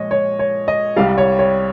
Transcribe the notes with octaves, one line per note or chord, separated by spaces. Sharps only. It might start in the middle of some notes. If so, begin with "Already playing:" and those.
Already playing: A#2 F3 G#3 C#5 D#5
C#5
C#5
D#5
C2 C3 G3 F5
C#5
C#5